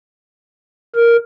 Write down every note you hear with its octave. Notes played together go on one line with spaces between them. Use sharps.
A#4